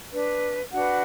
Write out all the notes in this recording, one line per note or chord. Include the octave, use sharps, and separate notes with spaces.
D4 B4
D4 F#4 B4 F#5